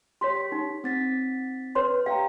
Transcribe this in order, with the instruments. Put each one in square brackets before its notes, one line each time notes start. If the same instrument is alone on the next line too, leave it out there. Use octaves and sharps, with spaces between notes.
[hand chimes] G4 B6 [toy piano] C#5 C6
[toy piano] D#4
[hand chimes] C4 A6 B6
[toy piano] B4 C#5 C6
[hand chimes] G4 G5 A#5 [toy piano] F5